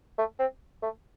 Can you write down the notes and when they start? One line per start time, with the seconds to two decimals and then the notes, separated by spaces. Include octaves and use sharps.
0.18 A3
0.39 C4
0.82 A3